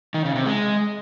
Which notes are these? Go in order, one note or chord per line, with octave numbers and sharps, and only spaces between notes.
D#3
C#3
C3
G#3